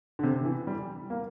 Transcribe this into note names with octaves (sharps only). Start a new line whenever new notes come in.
D3
C3
E3
G3
A#3